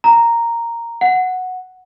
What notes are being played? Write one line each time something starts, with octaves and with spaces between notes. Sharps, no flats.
A#5
F#5